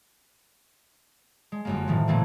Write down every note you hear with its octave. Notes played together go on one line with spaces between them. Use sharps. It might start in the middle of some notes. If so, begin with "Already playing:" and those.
G#3
G1 F#2 A#3
A2 D#3 F3
A#2 D3 E3 A3 A#3 C4